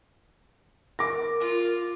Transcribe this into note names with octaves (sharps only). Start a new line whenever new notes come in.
A#4 D6 A#6
F4